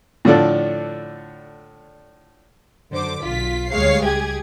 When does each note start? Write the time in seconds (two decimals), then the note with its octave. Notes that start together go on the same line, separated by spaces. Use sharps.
0.25 A2 D3 F3 D4 A4
2.91 F#2 D3 C5 D6
3.22 B1 F4 B6
3.70 D2 G3 G#3 C#5 F5 C7
4.03 C#2 G4 G#4 G#6